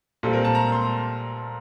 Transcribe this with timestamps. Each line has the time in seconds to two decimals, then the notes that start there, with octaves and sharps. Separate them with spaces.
0.23 A#2 G3 C4 A4
0.33 A#4
0.45 A5
0.55 A#5
0.72 C6